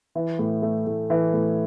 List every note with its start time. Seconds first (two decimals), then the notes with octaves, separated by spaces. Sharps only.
0.15 E3
0.39 A2
0.62 A3
0.86 A2
1.10 E3
1.33 A2